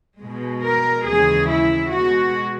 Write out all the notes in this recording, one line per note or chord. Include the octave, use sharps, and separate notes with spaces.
B2 G#3
A#4
D#2 C#3 E3 G#3 G#4
E4
B2 G#3 F#4